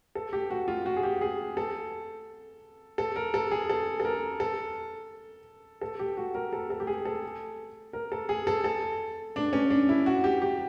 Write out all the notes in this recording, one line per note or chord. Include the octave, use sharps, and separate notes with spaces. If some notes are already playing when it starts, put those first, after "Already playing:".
A4
G4
F#4
F4
F#4
G#4
G4
G#4
A4
A4
A#4
A4
G#4
A4
A4
A#4
A4
A4
G4
F#4
A#4
A4
A4
G4
G#4
A4
A#4
A4
G#4
A4
A4
D4
C#4
D4
E4
F#4
G4
G4